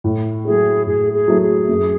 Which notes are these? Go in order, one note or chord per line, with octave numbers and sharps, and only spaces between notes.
A2
F#3 A3 E4 G#4 A4
A2 G#4
G#4
F#3 A3 E4 A4
G#4
F#2